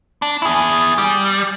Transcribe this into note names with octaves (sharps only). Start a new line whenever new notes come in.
D4
E4 G#4
G3